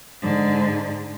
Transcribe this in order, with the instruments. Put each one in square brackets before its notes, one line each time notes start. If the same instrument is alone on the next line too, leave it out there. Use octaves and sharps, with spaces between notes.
[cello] G#2 D3